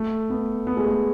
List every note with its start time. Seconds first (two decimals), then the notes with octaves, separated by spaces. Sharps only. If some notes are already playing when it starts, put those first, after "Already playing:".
Already playing: A3
0.30 B3
0.67 B3
0.77 G#3
0.86 A3